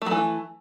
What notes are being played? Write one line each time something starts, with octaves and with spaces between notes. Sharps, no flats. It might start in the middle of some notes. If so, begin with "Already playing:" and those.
E3 F#3 A3